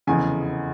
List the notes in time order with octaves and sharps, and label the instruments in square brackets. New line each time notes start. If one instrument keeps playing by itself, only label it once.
[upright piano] F1 E2 C#3 G#5